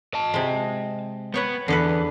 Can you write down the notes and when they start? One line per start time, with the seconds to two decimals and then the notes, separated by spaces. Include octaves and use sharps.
0.14 D#5 A5
0.34 C3 G#3
1.34 B3 B4 C#5 G5
1.68 E2 D3 A4 B4